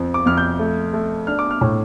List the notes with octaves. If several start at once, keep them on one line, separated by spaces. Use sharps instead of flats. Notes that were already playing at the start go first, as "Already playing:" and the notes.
Already playing: F2 F3
D6
F2 F6
G6
A3
A3
D4 F6
D6
F6
A2